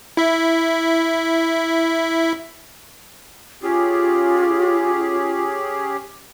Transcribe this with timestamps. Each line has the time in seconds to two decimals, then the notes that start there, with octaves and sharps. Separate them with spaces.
0.17 E4 E5
3.63 C#4 F4 G4 G#4